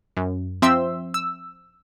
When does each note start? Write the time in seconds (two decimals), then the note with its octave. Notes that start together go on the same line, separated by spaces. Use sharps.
0.17 F#2
0.62 F3 C4 C5 E5 C6 E6
1.14 E6